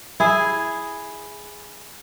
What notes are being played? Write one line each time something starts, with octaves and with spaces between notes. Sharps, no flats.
E4 G#4